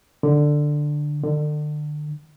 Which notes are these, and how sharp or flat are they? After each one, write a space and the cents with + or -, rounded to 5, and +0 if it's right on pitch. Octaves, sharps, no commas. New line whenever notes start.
D3 +10
D3 +35